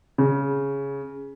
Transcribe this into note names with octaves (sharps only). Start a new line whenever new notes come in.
C#3